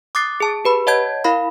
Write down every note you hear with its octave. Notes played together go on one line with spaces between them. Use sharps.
D6 D#6 F#6 A6 C7
G#4 A5
G4 B4 B5
C#5 D#5 F#5 A5 G6 G#6
E4 A#4 F5 B5